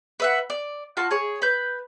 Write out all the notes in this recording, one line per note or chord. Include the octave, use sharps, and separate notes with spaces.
B4 E5 F#5
D5
F4 F#4 A5
G#4 C#5
B4 G6